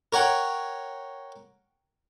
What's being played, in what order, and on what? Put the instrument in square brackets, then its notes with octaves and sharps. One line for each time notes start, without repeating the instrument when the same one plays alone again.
[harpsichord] A#4 C#5 F#5 G5